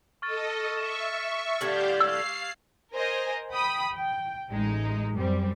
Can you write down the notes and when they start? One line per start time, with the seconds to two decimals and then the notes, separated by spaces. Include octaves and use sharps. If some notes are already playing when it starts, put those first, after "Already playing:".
0.22 A4 D#5 C#6 F6 A6
0.77 E5 C#6 E7
1.61 A2 D3 G3 G4 F5 G5 G#6 F#7
2.00 F5 E6 C7
2.92 A#4 C5 D#5 G#5
3.51 G5 B5 D#6
3.91 G5
4.49 A1 G#3 D#4
5.14 F#2 G3 C4